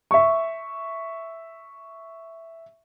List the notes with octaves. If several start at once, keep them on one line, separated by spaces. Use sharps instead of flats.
E5 C#6